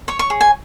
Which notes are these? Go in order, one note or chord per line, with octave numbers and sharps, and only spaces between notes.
C#5 C#6
C#6
G#4
G#5